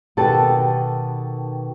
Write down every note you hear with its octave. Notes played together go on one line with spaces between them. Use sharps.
B2 D#3 G4 A4 B4 A5